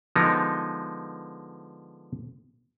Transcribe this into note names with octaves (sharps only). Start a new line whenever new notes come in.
D3 F3 G#3 B3 D#4 A#4